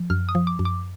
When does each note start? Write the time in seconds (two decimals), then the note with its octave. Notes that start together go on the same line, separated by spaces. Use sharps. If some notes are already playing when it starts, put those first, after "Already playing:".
Already playing: F3
0.10 F#2 F6
0.29 D#6
0.35 F3
0.47 D6
0.59 F#2
0.65 D6